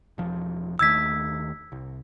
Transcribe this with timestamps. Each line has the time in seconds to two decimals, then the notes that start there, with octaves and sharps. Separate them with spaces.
0.18 E1 F3
0.79 D#2 D#3 A3 E6 G#6 B6
1.72 C2